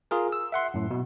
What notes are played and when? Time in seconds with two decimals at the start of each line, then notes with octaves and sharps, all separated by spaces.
0.11 F4 G#4 A#4
0.32 E6
0.52 E5 F#5 C6
0.74 F#2 A2
0.91 B2